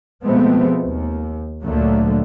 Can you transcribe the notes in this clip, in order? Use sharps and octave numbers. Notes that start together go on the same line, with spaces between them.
B2 F3 G#3 A3 B3 C4
D#2
D2 A#2 D3 F#3 A3 A#3